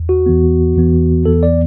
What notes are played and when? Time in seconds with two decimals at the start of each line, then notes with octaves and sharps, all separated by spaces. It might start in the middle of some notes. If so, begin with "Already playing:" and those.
Already playing: E2
0.09 F#4
0.26 E2 E3 B3
0.76 E2 E3 B3
1.26 E2 E3 B3 A4
1.43 D5